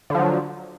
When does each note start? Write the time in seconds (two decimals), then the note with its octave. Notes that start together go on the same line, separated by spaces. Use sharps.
0.10 D3
0.15 F3
0.19 F#3